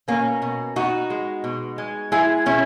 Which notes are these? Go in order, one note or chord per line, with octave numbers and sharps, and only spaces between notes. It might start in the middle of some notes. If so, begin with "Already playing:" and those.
B2 A#3 C#4
B2
B2 D#4 F#4
G#3
B2
G#3
G#3 E4 G#4
B2 C#4 E4